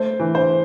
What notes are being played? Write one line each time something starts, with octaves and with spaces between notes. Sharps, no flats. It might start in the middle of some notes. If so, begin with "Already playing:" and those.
Already playing: A3 C5
E3
C5